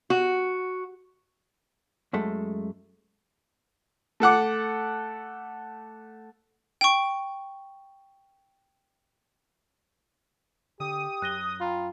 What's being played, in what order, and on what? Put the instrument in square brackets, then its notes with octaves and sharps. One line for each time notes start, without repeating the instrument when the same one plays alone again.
[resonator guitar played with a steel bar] F#4
[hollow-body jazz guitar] F#2 G#3 A3
[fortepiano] A3 A4 F#5 D6
[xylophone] G5 C#6
[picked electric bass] D3 [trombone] G4 [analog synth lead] D#6
[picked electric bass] F#2 [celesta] F#6 A#6 G7
[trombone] F4 [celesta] G5 A#5 B5